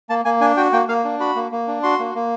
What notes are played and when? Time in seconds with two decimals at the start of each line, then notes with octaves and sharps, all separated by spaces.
0.10 A#3 A5
0.25 A#3 G#5
0.41 D4 G#5
0.57 F#4 G5
0.73 A#3 G5
0.89 A#3 F5
1.04 D4
1.20 F#4 B5
1.36 A#3
1.52 A#3
1.68 D4
1.83 F#4 C6
1.99 A#3
2.15 A#3